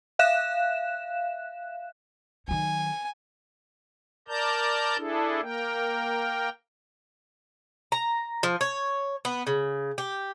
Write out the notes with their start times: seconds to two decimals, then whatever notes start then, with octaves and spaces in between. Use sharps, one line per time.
0.19 E5 F5 F#6 E7
2.48 D#3 F#3 G#5
4.28 A#4 D5 A5 A#5 G6
4.97 D4 E4 G#4 A4
5.42 A#3 A#4 G5
7.92 A#5
8.43 F3
8.61 C#5
9.25 B3
9.47 C#3
9.98 G4